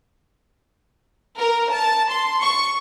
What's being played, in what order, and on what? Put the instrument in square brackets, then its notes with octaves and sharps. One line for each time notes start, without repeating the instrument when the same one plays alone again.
[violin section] A#4
A5
C6
C#6